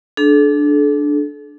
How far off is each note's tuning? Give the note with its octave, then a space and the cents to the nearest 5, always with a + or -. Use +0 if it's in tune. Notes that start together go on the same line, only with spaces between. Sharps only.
D4 +0 A4 -40